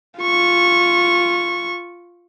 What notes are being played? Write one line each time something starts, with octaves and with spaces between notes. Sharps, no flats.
F4 C#6